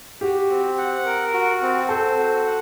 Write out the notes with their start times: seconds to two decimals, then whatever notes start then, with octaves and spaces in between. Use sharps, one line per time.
0.21 F#4 G4
0.50 C4
0.78 F#5
1.06 A#4
1.34 F#4
1.62 C4
1.89 A4 C5
2.18 F#4
2.45 F#5